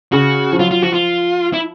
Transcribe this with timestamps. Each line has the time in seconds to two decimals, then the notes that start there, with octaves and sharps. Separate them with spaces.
0.12 C#3 F#4
0.53 F3
0.59 F#3 F4
0.71 F4
0.82 F3 F#4
0.94 F4
1.53 E4